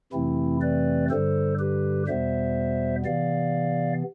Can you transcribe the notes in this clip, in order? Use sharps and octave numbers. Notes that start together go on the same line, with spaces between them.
F2 C3 E3 A3 C4 E4
B4 D5
G2 D3 G3 A4 C5
G4 B4
E2 B2 G3 B3 C5 E5
C3 E3 B3 D5 F5